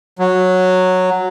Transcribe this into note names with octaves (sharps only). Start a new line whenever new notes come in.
F#3